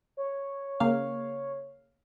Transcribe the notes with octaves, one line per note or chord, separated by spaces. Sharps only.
C#5
C#3 A#3 F5